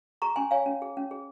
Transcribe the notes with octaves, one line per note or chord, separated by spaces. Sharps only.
G#4 A#5 C#6
C#4 G#5 C6
C#5 F5 G#5
C#4
G#4
C#4
G#4